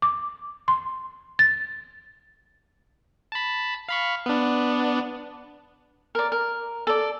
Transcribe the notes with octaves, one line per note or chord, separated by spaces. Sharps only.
D6
C6
A6
A5 B5
F5 B5 C#6
B3 D4
A#4 D5
A#4
A4 D5